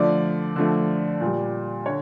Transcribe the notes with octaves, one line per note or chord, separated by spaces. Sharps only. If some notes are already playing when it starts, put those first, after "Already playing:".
Already playing: D3 F3 A3 D5
D3 F3 A3
A#2 G3
D3 C#5